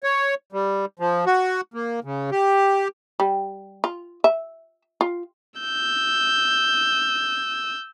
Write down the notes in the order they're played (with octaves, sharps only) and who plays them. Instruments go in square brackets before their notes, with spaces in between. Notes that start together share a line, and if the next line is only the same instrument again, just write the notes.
[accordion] C#5
G3
F3
F#4
A#3
C#3
G4
[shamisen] G3
F4
E5
F4
[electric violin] E6 G6